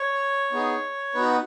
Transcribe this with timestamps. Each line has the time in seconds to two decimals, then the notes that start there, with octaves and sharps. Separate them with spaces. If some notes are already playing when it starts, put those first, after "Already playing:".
Already playing: C#5
0.52 B3 D#4 G#4
1.14 B3 D#4 F#4 B4